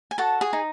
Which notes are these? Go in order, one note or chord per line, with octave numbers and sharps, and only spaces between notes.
G#5
F#4 A4 A5
G#4 G#5
D#4